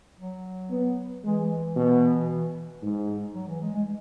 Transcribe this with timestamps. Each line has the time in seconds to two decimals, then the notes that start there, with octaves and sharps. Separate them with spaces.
0.17 F#3
0.70 B3
1.23 E3 G#3
1.76 B2
2.83 G#2
3.35 F#3
3.48 E3
3.61 G#3
3.74 G#3